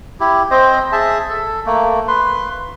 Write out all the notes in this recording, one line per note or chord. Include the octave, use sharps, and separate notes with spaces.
E4 G4
C4 C5 D#5
G#4 E5 A5
A4
A3 A#3
B4 C6